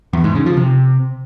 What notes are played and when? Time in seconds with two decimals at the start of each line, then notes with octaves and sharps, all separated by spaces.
0.13 E2
0.24 G#2
0.35 C#3
0.46 F3
0.57 C3